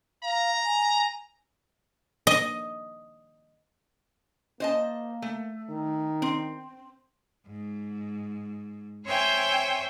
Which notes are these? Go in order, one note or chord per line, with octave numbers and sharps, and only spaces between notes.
F5 A#5
G#5
D#5
A#3 C5 D#5 A5
A3
D#3
C4
G#2
C4 C5 C#5 E5 G5 G#5